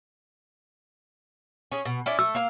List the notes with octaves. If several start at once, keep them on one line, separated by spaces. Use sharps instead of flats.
C#4 G#4
B2
C#4 E4 D5
A3 E6
A#3 F5